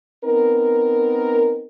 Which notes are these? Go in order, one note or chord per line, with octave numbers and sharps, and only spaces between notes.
B3 C4 D#4 A#4